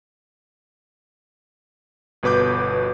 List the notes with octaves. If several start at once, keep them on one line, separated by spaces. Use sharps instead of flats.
G1 B2 B4 D6 G6